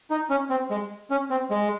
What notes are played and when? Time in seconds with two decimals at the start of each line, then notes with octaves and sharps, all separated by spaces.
0.10 D#4
0.30 C#4
0.50 C4
0.70 G#3
1.10 C#4
1.30 C4
1.50 G#3